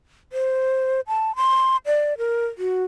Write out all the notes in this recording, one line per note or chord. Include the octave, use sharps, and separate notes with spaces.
C5
A5
C6
D5
A#4
F#4